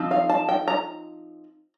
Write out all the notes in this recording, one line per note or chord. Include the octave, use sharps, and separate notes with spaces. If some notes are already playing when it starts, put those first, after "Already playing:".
Already playing: F3 C4 D#4
F5
A5
G5
A#5